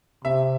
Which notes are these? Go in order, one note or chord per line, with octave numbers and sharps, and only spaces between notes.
C3 E5